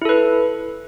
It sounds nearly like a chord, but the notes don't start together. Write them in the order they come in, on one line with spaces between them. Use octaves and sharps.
E4 A4 B4